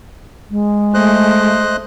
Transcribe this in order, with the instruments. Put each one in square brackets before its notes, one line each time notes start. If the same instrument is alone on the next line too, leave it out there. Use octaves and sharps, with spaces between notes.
[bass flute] G#3
[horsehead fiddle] A3 [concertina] C5 D#5 F#6